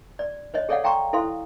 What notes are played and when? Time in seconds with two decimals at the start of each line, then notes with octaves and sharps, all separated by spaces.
0.19 D5
0.54 C5 C#5 D#5
0.69 G#4 A4 C#5 D5 F5 F#5
0.84 F5 G5 A#5 C6 C#6
1.13 E4 A4 C5 F5 C6